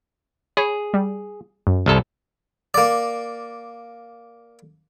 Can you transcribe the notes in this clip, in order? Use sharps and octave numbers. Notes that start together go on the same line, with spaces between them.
G#4 C#5 B5
G3
F#2
C2 C3 A4
A#3 D5